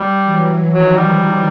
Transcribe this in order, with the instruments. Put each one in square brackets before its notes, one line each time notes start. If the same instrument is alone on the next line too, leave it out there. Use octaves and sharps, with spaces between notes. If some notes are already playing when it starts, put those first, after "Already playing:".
Already playing: [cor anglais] G3
[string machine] E3 F#3
[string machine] D#3 F3 [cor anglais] F#3
[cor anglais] G3